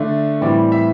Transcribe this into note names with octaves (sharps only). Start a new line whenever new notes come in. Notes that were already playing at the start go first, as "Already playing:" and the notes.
Already playing: D3 A3 D4
A2 E3 G3 C4 D5
E5